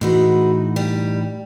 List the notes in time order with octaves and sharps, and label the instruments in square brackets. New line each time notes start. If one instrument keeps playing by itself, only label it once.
[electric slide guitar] A2 E3 D#4 [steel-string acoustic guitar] G#3 F#4 B4
[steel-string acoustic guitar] G3